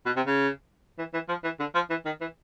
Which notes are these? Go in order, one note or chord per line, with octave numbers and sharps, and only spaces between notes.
B2
C3
C#3
E3
E3
F3
E3
D3
F3
E3
D#3
E3